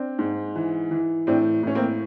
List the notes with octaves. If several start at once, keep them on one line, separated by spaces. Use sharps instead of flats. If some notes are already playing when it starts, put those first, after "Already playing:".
Already playing: C4 D4
G#2
E3
E3
A2 C4 D4
A2 C#4
A#3 C4